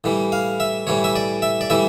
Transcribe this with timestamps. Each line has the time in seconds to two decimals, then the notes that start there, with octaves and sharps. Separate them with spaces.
0.04 A2 E3 G3
0.32 F5
0.60 E5
0.87 A2 E3 G3 C#5
1.04 E5
1.16 D5
1.42 E5
1.61 D5
1.70 A2 E3 G3 E5